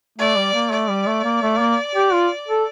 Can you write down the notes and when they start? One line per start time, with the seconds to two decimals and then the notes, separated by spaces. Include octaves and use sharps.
0.18 A3 D5
0.36 G3
0.54 A#3
0.71 A3 D5
0.89 G3
1.07 A3
1.24 A#3
1.42 A3
1.59 A#3
1.95 G4
2.12 F4
2.48 A4